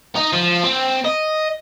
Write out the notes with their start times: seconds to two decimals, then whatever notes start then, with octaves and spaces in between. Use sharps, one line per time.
0.16 D#4
0.33 F3
0.63 C4
1.05 D#5